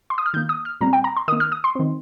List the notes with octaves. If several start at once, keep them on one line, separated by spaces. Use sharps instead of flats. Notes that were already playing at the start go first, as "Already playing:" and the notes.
C6
D#6
F6
D#3 A#3 G6
D#6
F6
A#2 G3 C4 A#5
G5
A#5
C6
D#3 A#3 D#6
F6
D#6
C6
D#3 C4